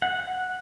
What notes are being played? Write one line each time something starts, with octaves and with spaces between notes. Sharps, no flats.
F#5